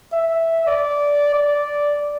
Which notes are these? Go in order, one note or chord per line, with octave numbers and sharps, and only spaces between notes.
E5
D5
D5